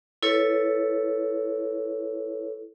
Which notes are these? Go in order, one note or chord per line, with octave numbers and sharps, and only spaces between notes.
E4 A4 B4 C#5